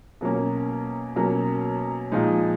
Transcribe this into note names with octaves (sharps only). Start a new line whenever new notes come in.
B2 F#3 A#3 C#4
B2 F#3 A#3 C#4
A#2 F3 G#3 D#4